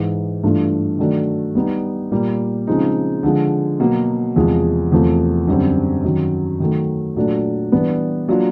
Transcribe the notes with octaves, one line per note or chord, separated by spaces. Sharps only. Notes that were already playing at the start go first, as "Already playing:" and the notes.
Already playing: G#2 E3 G#3
G2 E3 A3 D4 F4
D#3 F#3 A3 D4
G3 B3 D#4
A#2 G3 A#3
C#3 F3 G#3 C4 D#4
D3 F3 G#3
B2 F#3 A#3
E2 C3 F3 G#3
E2 C3 F3 A3
F#2 D3 G3 C4
F#2 D#3 F#3
D#3 F#3 A3
A#2 F#3 A3 D4
E3 G3 B3 D4
F#3 A#3 D4 F4